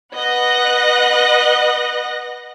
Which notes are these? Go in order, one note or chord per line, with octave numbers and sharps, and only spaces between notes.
B4 D#5 F#5 F#6 A#6